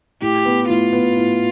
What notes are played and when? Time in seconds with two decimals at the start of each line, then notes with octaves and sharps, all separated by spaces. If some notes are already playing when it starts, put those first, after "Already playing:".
0.22 A2 G4
0.45 B3
0.70 A2 F4
0.93 B3
1.17 A2